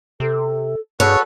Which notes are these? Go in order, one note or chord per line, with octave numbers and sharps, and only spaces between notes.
C3 A4
G2 F#4 G#4 A4 B4 C#5